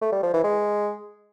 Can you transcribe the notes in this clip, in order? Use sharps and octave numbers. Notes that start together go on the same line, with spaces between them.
A3
G3
F3
E3
G#3